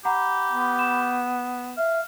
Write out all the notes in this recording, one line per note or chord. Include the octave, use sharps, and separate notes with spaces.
G4 F#5 A#5 B5
B3
E7
E5 F5